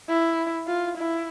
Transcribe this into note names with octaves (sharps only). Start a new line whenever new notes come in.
E4
F4
E4